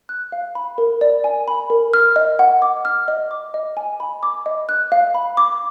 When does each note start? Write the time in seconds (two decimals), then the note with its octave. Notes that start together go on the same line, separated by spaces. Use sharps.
0.09 F#6
0.32 F5
0.55 B5
0.78 A#4
1.01 D5
1.24 G#5
1.48 B5
1.70 A#4
1.94 F6
2.16 D#5
2.39 F#5
2.62 D6
2.85 F6
3.08 D#5
3.31 D6
3.54 D#5
3.77 G#5
4.00 B5
4.23 D6
4.46 D#5
4.69 F#6
4.92 F5
5.15 B5
5.37 D6